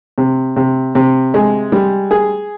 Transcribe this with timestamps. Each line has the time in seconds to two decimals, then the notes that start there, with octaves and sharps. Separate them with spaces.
0.18 C3
0.56 C3
0.95 C3
1.34 G#3
1.72 G3
2.11 G#4